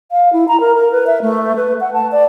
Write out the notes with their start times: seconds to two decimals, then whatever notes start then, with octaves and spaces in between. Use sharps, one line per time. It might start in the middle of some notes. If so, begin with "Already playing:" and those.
0.12 F5
0.33 E4
0.48 A#5
0.60 A#4
0.75 A#4
0.92 B4
1.07 E5
1.22 A3
1.56 B4
1.81 F#5
1.93 A5
2.12 D5